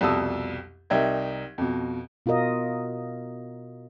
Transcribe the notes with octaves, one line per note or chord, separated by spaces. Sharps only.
C2 F2 B2 A5 D#6 E6
C2 D#4 A#4 E5 G5 G#6
F2 B2
B2 F4 F#4 A#4 D#5